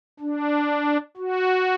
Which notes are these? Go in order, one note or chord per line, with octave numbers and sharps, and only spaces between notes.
D4
F#4